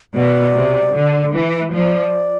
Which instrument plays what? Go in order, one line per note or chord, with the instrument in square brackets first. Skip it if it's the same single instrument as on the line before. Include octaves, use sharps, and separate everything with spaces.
[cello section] B2 [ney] D5
[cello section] C3
D3
E3
[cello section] F3 [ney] D5